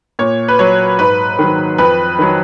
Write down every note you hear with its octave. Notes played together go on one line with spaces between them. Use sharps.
A#2 C#5
B4
F#3 C#5
G#2 B4
D#3 F#3
F2 B4
D#3 F#3